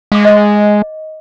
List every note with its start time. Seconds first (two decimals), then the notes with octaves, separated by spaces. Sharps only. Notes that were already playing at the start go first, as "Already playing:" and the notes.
0.12 G#3 F5 D6
0.25 D#5